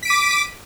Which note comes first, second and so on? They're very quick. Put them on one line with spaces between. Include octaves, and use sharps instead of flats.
B6 D7 D#7 D6